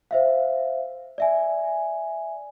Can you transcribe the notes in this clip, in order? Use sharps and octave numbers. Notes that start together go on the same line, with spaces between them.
C5 E5 F5
D5 E5 G#5